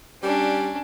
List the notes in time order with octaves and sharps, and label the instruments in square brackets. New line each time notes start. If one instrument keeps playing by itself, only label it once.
[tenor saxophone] G3 [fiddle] C#4 D4